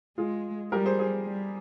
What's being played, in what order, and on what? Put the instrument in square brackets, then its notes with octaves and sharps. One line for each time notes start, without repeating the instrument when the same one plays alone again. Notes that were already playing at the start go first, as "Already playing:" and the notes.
[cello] G#3 [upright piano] F4 G#4
[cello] G3 [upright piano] G4 A#4
[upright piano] G#4 C5
G#4 C5
[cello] G3